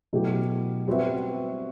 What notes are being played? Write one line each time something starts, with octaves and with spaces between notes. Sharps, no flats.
B2 F#3 A3 E4 G4
G3 C4 F#4 B4 E5